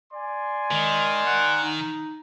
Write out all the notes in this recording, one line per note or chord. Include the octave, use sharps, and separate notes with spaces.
D5 G#5 C6
D#3 G#3
F#5
D#4